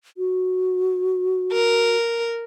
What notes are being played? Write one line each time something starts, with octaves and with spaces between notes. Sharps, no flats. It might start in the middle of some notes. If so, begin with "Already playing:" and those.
F#4
A#4